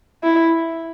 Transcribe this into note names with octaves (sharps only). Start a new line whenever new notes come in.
E4